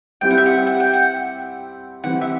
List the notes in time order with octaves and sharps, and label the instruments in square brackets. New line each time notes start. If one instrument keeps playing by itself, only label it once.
[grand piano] G3 C4 E4 G4 [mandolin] G5
[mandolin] F#5
E5
F#5
F#5
G5
F#5
[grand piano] E3 G3 C4 [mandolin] F#5
[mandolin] E5